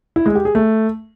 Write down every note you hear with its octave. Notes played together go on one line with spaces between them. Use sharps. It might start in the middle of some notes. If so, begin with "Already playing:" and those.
E4
G#3
G4
G#4
A3